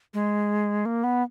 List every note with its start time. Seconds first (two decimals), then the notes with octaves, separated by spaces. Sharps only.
0.14 G#3
0.86 A#3
1.04 B3